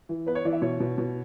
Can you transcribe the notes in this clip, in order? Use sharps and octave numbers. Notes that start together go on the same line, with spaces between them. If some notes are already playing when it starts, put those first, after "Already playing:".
E3
B3 B4
C#5
E3 D5
E5
B2 C#5
B2
B2